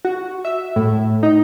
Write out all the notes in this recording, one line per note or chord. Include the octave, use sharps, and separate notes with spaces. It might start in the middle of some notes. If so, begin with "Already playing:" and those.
F#4
E5
A2
D#4